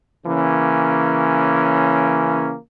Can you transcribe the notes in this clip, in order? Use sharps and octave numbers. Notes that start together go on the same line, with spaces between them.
C#3 E3 A#3 C#4